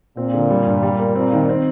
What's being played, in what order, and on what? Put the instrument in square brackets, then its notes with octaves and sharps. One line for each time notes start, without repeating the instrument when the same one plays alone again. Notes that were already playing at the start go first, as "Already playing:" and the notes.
[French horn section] A#2 [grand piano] C4
[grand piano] D3
G3
G2
G3
A#3
[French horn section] A#2 [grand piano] C4
[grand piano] D#3
C4